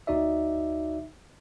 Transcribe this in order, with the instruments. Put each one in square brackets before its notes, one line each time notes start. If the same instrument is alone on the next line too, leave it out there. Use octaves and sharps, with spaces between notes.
[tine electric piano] D2 D#4 F#4 D5 E5